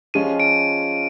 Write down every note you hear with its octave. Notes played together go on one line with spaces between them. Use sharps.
F3 G#3 C#4 F4 D#7
D7